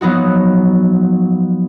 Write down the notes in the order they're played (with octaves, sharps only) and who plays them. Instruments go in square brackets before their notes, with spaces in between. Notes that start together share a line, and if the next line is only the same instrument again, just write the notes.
[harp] F3 F#3 B3 D#4 F#4